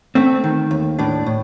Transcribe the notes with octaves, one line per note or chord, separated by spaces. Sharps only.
A3 C4
D#3
D#2
A2 D4
A2